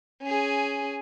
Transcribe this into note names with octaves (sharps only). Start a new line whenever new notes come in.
C#4 G#4